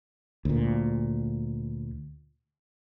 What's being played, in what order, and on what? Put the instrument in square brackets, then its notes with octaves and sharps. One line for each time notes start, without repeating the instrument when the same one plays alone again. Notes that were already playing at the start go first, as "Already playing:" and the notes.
[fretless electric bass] D2 A#2